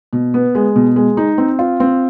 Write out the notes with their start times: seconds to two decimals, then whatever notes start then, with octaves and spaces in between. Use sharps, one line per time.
0.13 B2
0.34 B3
0.55 G#3
0.76 B2
0.96 G#3
1.17 D#4
1.38 C4
1.59 F4
1.80 C4